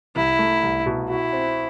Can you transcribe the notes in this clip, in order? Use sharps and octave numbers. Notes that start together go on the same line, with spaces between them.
C2 E4
A3
C2
B2
E4 F#4
C4